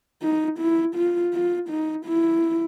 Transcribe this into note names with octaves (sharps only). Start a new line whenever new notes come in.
D#4
E4
F4
F4
D#4
E4